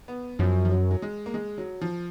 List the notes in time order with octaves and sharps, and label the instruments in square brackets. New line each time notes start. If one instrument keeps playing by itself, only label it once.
[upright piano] B3
[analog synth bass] F#2 [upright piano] F3
[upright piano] F3
F#3
F#3
G#3
A#3
G#3
F#3
F3